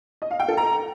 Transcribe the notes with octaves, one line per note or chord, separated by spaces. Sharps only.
D#5
F5
G5
A4
A#5